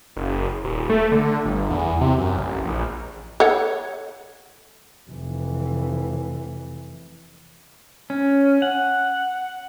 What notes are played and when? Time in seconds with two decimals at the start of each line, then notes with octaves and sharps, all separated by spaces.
0.16 F#1
0.64 D#1
0.90 A3
1.12 D3
1.45 G1
1.70 E2
2.01 C3
2.18 F#2
2.37 A1
2.64 A#1
3.40 A4 C#5 F#5
5.10 F1 E3
8.10 C#4
8.62 F#5